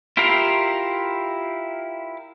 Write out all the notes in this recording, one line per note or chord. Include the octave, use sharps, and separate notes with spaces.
E4 F4 G4 A#4 F5